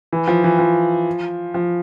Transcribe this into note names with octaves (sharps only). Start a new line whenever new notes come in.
E3
F3
E3
F3
F3